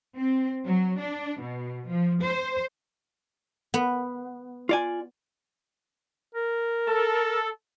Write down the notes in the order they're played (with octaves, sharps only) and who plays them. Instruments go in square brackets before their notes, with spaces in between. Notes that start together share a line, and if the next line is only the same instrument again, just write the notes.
[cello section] C4
F#3
D4
B2
F3
C5
[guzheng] B3
[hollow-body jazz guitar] F4 D5 G#5
[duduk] A#4
[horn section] A4